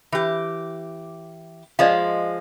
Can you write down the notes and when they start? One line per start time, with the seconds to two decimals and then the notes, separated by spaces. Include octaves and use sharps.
0.12 E3 G4
1.79 F3 G#3 D5 D#5 F5